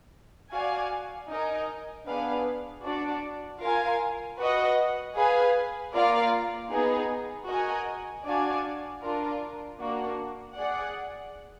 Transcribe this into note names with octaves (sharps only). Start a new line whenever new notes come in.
F#4 D5 F5 G#5
D#4 A#4 D#5 G#5
B3 D4 G#4 B4 F5
D4 F#4 D5
F4 A#4 F5 G#5
F#4 B4 D#5 F#5
G#4 B4 F5 G#5
A#3 F4 A#4 D5 F5
B3 D#4 G#4
F#4 A#4 D#5 G#5
D4 F#4 D5 F5 G#5
D4 F4 A#4
A#3 D4 F#4
G#4 D5 F#5